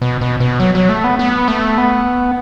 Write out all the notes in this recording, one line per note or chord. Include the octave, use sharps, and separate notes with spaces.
B2
B2
B2
F#3
F#3
A3
B3
B3
A3
B3